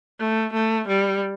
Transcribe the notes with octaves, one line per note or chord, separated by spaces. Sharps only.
A3
A3
G3